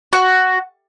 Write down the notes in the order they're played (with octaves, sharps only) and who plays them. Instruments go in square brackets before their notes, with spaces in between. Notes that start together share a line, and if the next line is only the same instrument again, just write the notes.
[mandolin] F#4